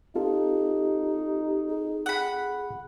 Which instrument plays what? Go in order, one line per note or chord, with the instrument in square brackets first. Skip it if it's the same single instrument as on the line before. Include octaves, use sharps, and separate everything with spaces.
[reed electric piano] C4 F4 A4 [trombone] D#4 [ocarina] G4
[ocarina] G#4
[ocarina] G#4 [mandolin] F#5 B5